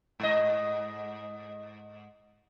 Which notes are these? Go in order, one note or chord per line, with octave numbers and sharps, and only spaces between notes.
G#2 D#5